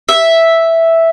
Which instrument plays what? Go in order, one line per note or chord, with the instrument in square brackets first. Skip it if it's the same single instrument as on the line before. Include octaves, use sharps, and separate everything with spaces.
[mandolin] E5